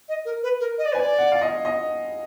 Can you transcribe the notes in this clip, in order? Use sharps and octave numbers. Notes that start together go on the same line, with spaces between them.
D#5
A#4
B4
A#4
D#5
D5
B4 G#5
D5
F#5
F5
D#5
D#5